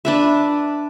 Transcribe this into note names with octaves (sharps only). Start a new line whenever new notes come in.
D4 B4 E5